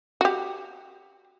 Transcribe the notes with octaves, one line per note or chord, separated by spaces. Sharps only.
F#4 G4